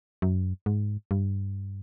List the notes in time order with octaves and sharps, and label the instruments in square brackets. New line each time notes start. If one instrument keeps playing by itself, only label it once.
[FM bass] F#2
G#2
G2